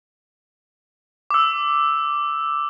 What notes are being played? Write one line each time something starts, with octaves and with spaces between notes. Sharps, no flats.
D6 E6